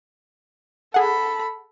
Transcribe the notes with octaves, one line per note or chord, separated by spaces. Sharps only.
G#4 A4 F#5 B5